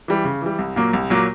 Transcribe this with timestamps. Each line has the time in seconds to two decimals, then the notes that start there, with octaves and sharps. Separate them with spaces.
0.08 E3 G3
0.25 C#3
0.42 E3 G3
0.59 C2
0.76 A#2 F#3 A#3
0.93 C2
1.10 A#2 F#3 A#3